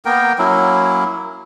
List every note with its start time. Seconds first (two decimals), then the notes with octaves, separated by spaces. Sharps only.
0.05 A#3 B3 A#4 G5
0.38 F#3 A#3 C#4 E4